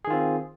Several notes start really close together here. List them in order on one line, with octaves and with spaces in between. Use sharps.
G#4 D#3 F4 C4